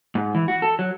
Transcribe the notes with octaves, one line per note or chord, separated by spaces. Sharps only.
G#2
E3
F#4
A4
F#3